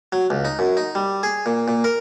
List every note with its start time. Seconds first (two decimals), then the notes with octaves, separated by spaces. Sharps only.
0.12 F#3
0.30 C#2
0.45 D#4
0.59 F#2
0.77 D#4
0.95 G3
1.23 G#4
1.46 A#2
1.68 A#2
1.84 A#4